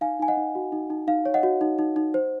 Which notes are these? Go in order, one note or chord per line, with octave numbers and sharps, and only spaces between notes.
D#4 F5 G#5
D#4 G#5
D#5 F#5
D#4
F#4
D#4
D#4
D#4 F5
C#5
D#5 F#5
F#4
D#4
D#4
D#4
C5